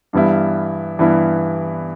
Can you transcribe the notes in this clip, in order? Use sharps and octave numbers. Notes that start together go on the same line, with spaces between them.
G2 E3 G3 B3 E4
G2 E3 G3 B3 E4